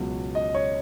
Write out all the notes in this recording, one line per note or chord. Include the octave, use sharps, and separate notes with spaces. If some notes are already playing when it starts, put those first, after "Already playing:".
Already playing: C#2 B2 F#3
D#5
C#5